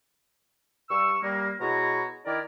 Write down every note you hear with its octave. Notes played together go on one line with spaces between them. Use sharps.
G2 C#6 E6
G3 A#3
B2 G#3 E4 F#4 C#5 A#5
D#3 D4 E4 A#4 D5